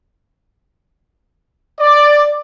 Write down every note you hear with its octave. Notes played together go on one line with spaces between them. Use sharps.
D5